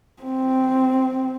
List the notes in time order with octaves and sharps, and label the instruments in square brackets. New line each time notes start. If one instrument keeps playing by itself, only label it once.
[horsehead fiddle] C4